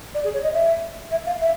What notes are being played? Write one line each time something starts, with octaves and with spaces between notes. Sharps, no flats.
D5
G#4
C#5
D#5
E5
E5
F5
E5